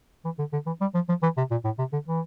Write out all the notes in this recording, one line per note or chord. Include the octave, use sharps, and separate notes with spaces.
E3
D3
D3
E3
G3
F3
F3
E3
C3
A#2
A2
C3
D3
E3